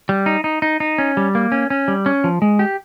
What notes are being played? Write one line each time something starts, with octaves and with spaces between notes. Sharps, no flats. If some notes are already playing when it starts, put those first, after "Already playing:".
G3
D#4
D#4
D#4
D#4
C#4
G3
A#3
C#4
C#4
G3
C#4
F3
G#3
G4